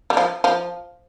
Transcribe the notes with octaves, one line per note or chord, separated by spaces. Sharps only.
G3
F3
F3